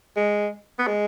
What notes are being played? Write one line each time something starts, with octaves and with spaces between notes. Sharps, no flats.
G#3
B3
G#3